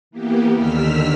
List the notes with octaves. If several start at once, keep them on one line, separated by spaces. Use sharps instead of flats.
E3 A#3 B3 G4
D#2 D3 D#3 E6 F6 B6